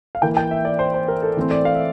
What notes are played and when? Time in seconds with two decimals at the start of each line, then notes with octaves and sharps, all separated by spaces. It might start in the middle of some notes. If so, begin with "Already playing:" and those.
0.15 F5
0.22 E3 A#3 G5
0.37 G5
0.51 E5
0.65 D5
0.79 C5
0.94 C5
1.08 A#4
1.22 A4
1.37 E3 A3 C4
1.51 D5
1.65 F5
1.75 E5